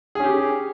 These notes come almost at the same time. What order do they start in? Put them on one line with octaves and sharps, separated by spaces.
G#4 C#4 G4